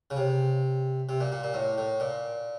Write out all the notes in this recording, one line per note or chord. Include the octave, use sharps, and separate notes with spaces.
C#3
C3
C3
A#2
A#2
A#2
A2
A2
A#2